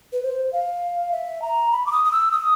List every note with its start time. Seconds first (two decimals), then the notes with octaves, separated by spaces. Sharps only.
0.13 B4
0.23 C5
0.53 F5
1.12 E5
1.42 A#5
1.72 B5
1.86 D6
1.92 D#6
2.05 D#6
2.12 E6
2.31 D#6